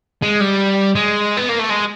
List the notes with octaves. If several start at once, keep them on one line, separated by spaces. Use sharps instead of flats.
G#3
G3
G#3
B3
A#3
A3
G#3